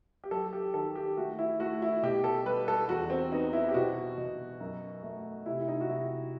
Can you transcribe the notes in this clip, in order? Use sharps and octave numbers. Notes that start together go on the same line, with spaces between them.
G4
F#3 A4
G4
D#3 A4
G4
A3 F#4
E4
A3 F#4
E4
B2 G4
A4
G3 B4
A4
E2 F#4
C4
B3 D#4
E4
G4
B2 F#4
B2
F#2
A3
C3 E4
E4
D#4
F#4
C3 E4